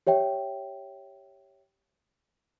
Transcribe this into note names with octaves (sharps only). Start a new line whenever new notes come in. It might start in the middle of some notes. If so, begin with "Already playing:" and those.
G4 C#5 E5 G5